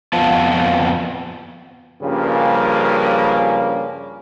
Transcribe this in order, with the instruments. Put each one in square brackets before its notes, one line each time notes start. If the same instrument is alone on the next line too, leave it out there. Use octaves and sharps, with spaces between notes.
[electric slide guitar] F2 B3 F4 A5
[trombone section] G2 C#3 F3 G3 A#3 C#4